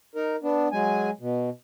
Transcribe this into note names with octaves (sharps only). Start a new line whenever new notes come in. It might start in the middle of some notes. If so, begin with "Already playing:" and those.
D#4 A#4
B3 D4
F#3 G#3 G#5
B2